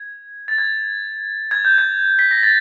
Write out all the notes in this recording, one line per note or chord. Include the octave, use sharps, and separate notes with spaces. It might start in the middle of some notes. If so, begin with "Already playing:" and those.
Already playing: G#6
A6
G#6
G#6
G6
G#6
B6
A#6
A6